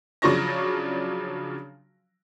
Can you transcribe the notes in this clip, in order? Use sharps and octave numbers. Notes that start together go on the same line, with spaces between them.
C#3 F3 F#3 D4 C#6 A#6